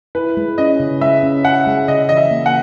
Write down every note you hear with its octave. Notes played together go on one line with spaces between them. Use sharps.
E4 B4
G#3
C#4 D#5
C#3
G#3 E5
C#4
G#4 F#5
G#3
C#3 D#5
E3 D#5
E5
A#3
F#5